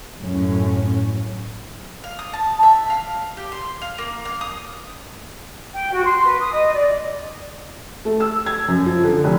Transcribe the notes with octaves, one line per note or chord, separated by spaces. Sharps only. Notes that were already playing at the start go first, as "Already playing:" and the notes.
F#2 A2 F#3 C#4
F5
D#6
A5
E5
F5
G4
C6
F5
A#3
F5
D#6
G5
F#4
C6
B4
D#6
D#5
D5
A3
E6
G#6
F#2
F3
D3
F1